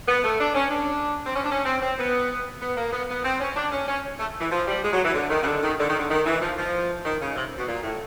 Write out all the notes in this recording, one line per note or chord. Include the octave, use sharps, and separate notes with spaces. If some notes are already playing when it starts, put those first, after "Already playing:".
B3
A3
D4
C#4
D4
C4
C#4
D4
C#4
C4
C4
B3
B3
A#3
B3
B3
C4
C#4
D4
C#4
C#4
A3
E3
F3
G3
G#3
F#3
E3
D3
D#3
C#3
D3
D#3
D3
D#3
D3
D#3
E3
F3
F3
D#3
C#3
C3
B2
A#2
A2